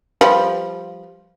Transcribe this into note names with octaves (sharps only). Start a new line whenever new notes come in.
F3 G3 B4